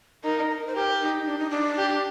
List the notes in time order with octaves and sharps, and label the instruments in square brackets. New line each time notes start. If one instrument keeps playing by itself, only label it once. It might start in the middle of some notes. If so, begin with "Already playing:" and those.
[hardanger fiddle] D#4 [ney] A#4
[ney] A#4
C5
[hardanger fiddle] G4 [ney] A#4
[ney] D#4
D4
D#4
D4
[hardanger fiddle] G4